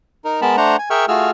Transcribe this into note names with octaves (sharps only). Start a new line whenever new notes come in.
D#4 A#4
G#3 B3 A#4 A5 B5
A3 D4 C5 F#5 A#5
G#5
G#4 A#4 E5 G5 C#6 F6
A3 F4 F#4 G#4 E6 F6